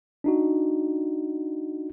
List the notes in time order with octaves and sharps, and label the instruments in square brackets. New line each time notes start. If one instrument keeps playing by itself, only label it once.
[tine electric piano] D4 D#4 F#4